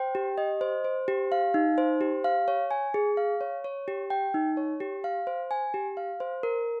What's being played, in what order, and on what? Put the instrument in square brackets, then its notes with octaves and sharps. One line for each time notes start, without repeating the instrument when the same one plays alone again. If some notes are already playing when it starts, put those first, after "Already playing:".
Already playing: [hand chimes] C5 G5
G4
D#5
C5
C5
G4
F5
D#4
C5
G4
F5
C#5
G#5
G#4
F5
C#5
C#5
G4
G5
D#4
C#5
G4
F5
C5
G#5
G4
F5
C5
A#4